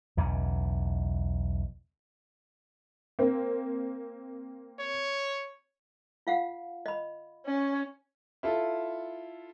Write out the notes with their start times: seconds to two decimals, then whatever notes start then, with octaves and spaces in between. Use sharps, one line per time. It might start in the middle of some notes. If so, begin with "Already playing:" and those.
0.17 B1 E2 C#3
3.19 A#3 C4
4.80 C#5
6.27 F4 F5 F#5
6.86 D#5 B5
7.45 C#4
8.43 E4 F4 A4